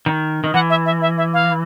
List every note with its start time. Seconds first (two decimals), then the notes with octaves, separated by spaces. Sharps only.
0.06 D#3
0.44 D#3
0.54 E3 F#5
0.70 E5
0.86 E5
1.02 E5
1.18 E5
1.34 F5